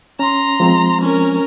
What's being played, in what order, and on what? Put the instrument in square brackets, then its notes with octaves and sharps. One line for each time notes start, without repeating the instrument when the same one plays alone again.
[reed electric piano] C#4 [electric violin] A#5 C6
[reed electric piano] F3 G#3 C4
[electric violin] C#4 A#4